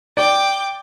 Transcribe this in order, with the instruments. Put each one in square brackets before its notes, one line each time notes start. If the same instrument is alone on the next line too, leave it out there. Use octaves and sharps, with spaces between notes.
[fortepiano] D5 [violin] G5 D6